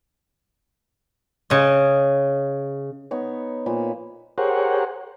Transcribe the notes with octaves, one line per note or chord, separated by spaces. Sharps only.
C#3 D#5
B3 D#4 C#5
A#2 F3 B5
G4 G#4 A#4 C5 C#5 F#5